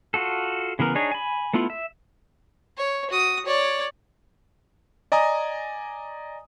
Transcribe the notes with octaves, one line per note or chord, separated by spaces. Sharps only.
F4 F#4 A4
C#3 E3 B3 A#4
D4 D#4 G#4 C#5
G#5 B5
A3 B3 E4 F4
E5
C#5
F#4 D#6
C#5 D5
D5 D#5 G#5 A#5 D#6